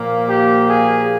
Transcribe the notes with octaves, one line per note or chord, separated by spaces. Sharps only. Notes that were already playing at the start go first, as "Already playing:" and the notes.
Already playing: A#2 F3 A#3
G4
G#4